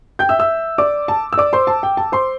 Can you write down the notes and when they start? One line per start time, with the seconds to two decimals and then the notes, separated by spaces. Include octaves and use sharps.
0.19 G5 G6
0.29 E5 E6
0.39 E5 E6
0.78 D5 D6
1.08 A5
1.33 E6
1.38 D5 D6
1.53 C5 C6
1.67 A5
1.83 G5
1.97 A5
2.12 C5 C6